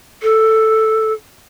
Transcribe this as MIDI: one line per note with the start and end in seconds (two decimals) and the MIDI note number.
0.23 1.13 69